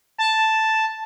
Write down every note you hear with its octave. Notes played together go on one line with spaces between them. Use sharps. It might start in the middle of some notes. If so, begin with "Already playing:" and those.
A5